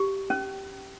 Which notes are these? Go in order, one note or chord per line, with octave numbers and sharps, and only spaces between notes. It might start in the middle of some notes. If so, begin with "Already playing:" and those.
Already playing: G4
C#4